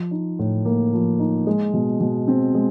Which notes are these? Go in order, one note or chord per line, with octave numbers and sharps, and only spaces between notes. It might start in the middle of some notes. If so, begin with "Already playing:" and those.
Already playing: F3
D#4
A2
A#3
F3
D#4
G#3
B2
B2
C4
G#3